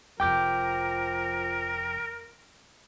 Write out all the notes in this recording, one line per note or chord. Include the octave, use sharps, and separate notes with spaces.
F1 F2 F3 A#4 G5 D6 G6